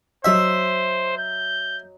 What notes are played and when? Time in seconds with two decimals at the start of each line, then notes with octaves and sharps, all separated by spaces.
0.25 F#3 C5 D#5 E5
1.17 G6